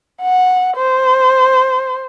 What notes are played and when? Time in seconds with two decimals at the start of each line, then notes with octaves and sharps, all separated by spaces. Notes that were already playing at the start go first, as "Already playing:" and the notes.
0.22 F#5
0.77 C5